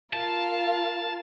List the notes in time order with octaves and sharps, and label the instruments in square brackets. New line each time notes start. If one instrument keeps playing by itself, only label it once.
[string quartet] F4 A#4 F5 [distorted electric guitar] A5